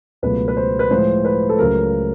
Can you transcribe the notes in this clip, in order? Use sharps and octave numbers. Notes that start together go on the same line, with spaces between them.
C#2 B2 F#3 A3 B4
B4
C5
B4
A2 F3 G#3 C5
B4
A4
C#2 C#3 F#3 A3 A#4